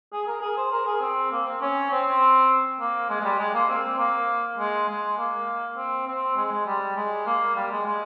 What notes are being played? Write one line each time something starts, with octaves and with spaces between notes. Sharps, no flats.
G#4
A#4
G#4
C5
A#4
G#4
C4
A#3
C4
C#4
C4
A#3
G#3
G#3
G3
G#3
A#3
C4
A#3
G#3
G#3
A#3
C4
C4
G#3
G#3
G3
G#3
A#3
G3
G#3
G#3